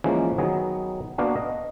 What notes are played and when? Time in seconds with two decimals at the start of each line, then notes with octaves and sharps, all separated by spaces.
0.04 E3 F3 G#3 A#3 C#4
0.38 D#3 F#3 B3 G#4
1.18 A#3 B3 D4 F#4 F5
1.36 D#5